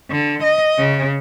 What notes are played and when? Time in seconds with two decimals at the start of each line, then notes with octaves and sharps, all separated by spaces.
0.11 D3
0.43 D#5
0.78 C#3